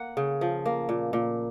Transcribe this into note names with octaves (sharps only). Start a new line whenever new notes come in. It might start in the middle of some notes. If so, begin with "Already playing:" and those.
Already playing: A#3 F#5
C#3
F3
A#3
A#2
A#2